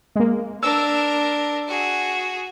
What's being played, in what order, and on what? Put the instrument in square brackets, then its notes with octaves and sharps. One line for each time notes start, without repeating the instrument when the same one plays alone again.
[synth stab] G#3 A#3
[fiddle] D4 A#4 [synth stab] E6
[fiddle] F#4 G#4